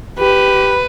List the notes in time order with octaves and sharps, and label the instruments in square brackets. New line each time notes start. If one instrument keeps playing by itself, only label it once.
[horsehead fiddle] G4 [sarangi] B4